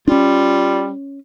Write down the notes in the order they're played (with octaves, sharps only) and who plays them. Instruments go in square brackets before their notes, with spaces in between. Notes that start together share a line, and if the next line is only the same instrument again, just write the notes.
[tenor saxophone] G3 [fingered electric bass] C#4 D4 [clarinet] F4